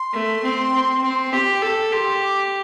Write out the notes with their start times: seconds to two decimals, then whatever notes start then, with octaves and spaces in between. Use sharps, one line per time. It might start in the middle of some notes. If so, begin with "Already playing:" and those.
Already playing: C6
0.13 A3
0.43 C4
0.72 C4
1.03 C4
1.33 G4
1.62 A4
1.92 G4 C6
2.21 D6